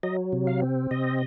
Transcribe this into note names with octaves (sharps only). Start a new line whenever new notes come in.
F#3 D#5
C3
F5
C4
C3 D#5